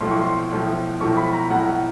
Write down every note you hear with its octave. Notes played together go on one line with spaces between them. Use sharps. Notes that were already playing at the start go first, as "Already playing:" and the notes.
B1 A2 F3 C6
C#6
C6
B1 A2 F3
B1 A2 F3 C#6
B5
A#5
B1 A2 F3 F#5